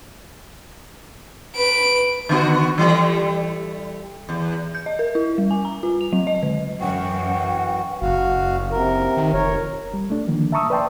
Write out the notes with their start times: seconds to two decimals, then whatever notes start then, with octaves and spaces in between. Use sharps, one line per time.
1.56 B4 D7
2.29 D3 B3 F#4
2.78 E3 G3 A3
4.29 E2
4.75 G6
4.86 D#5
4.99 A#4
5.15 E4
5.38 G3
5.51 G#5
5.65 A#5
5.83 F4
6.01 F7
6.13 F#3
6.27 D#5
6.43 D3
6.80 F#2 E3 F#4 F#5 G5
8.02 F#1 F#4 F5
8.72 C3 A#4
9.17 D#3
9.34 F1 A#4 C#5
9.94 G3
10.10 A3 D4
10.27 D3 D#3 F3 A#3
10.52 E5 A5 A#5 C#6 D#6 E6
10.70 B4 D5 E5 G5 A5 C6